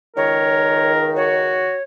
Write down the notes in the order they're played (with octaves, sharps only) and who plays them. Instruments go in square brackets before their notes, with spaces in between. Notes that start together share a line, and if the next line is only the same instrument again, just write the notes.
[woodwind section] C#2 D#3 [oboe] A#4 [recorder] C#5
[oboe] F#4 [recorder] C#5